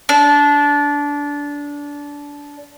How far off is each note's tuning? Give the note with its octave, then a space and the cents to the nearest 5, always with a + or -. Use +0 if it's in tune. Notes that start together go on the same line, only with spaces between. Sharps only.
D4 -20